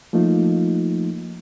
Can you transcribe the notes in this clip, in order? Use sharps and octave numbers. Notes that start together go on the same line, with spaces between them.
F3 A3 A#3 D#4 F4